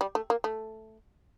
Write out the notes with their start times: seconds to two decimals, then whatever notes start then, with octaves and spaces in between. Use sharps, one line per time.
0.01 G3
0.15 A3
0.30 A#3
0.44 A3